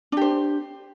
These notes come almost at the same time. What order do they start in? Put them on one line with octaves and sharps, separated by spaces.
D4 G4 C5